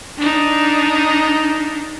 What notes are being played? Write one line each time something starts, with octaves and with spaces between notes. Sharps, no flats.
D4 D#4